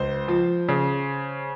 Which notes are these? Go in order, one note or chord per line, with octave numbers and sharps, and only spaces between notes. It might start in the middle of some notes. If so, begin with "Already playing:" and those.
Already playing: C#2 C5
F3
C#3